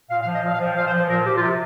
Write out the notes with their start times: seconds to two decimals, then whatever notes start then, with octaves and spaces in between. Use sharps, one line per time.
0.10 A#2 F5
0.22 F5
0.27 F3
0.33 D#5
0.43 A#2 F5
0.54 F5
0.59 F3
0.66 G5
0.76 A#2 F5
0.87 C5
0.93 F3
0.98 C5
1.09 A#2 A#4
1.26 F3 G4
1.37 F4
1.41 C3 G4